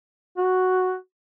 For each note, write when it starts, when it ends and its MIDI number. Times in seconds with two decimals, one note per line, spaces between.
0.38 0.95 66